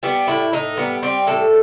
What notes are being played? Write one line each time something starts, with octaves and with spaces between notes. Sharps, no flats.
G3 B3
A2 E4
A2 D#4
G3 B3
G3 C4
A2 A4